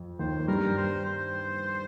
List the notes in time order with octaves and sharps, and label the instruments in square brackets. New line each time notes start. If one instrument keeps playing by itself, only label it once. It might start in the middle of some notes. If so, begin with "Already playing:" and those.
Already playing: [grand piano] F2
[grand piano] D#2 D#3 [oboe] C5
[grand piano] G2 G3 [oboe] A#4
[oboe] C5
C5